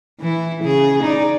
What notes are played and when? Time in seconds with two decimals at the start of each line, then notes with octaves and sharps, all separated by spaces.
0.20 E3 E4
0.64 C#3 G#4
1.03 D#4 D5